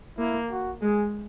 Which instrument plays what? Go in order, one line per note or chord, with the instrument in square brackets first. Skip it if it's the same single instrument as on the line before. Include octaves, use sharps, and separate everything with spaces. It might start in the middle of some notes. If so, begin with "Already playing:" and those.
[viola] A#3 [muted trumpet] E4
[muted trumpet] F#4
[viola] G#3 [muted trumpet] G#4